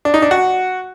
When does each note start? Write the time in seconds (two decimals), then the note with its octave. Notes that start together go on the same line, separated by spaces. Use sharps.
0.05 D4
0.14 D#4
0.22 D4
0.31 F#4